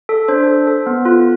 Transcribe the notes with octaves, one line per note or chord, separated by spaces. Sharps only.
A4
D4 C5
A4
A4
B3
F4